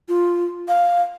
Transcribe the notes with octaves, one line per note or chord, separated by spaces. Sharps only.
F4
F5